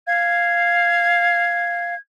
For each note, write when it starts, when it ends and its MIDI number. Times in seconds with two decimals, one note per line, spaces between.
0.07 1.95 77
0.07 1.98 92